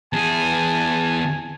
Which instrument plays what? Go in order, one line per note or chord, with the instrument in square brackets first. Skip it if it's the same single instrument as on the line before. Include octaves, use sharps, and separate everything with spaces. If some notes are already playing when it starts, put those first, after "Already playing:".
[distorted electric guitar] E2 G#4 [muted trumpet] G#5 [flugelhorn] A5